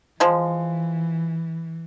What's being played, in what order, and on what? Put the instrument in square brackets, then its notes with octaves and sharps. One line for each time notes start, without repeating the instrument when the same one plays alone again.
[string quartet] E3 [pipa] F3 G#3